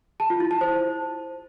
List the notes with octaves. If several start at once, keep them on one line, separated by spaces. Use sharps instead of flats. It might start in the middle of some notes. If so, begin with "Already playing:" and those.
A5
F4
E4
A5
C5